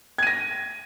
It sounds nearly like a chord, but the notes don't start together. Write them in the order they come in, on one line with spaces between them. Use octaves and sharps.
G#6 D#7 A#6